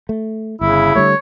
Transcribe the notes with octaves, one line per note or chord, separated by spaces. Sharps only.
A3
G1 C#3 E4
D3 G3 A3 C#5